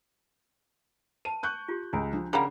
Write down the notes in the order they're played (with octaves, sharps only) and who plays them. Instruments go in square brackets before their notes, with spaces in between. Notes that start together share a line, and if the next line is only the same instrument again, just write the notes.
[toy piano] B4 A5 B5 [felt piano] D#7
[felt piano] C#6 F#6 G6
[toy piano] F4 G4
[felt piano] C#2 [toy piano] G#5 A#5
[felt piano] F3 [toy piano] D4
[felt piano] C#3 G#4 F#5 [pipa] G3 A#3 [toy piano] A#5 B5